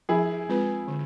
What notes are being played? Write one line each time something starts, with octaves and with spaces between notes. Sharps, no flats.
F3 E4 G#4
G#3 C4 F4 B4
D3